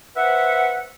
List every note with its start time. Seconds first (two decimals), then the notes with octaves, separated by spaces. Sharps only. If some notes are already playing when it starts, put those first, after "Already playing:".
0.17 B4 C5 E5 F#5